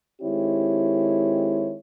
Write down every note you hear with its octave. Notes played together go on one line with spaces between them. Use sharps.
D#3 G#3 C4 E4 G4 C#5